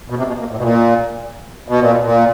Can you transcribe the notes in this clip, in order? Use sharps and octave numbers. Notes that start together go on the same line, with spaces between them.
B2
C3
B2
A#2
A2
B2
A#2
B2
A#2
B2
A#2